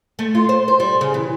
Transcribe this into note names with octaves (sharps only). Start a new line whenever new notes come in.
A3
F4
C5
C5
G3
C#3
E3